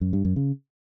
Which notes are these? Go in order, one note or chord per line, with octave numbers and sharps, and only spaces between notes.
F#2
G2
F#2
C#3